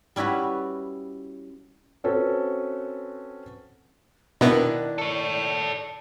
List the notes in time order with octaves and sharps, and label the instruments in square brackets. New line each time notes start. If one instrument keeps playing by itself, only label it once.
[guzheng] G3 C#4 E4 F#4 B4
[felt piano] C4 C#4 F#4 A4 B4
[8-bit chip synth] B2 B3 [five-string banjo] D#3 D4 E4 [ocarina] D5
[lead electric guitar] A4 C#5